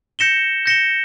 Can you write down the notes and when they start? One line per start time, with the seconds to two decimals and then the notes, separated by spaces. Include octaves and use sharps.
0.19 G6 A#6 C#7 E7 G7
0.66 G6 A#6 C#7 E7 G7